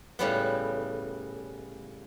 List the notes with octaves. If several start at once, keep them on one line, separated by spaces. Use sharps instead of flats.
A2 C#3 G3 B3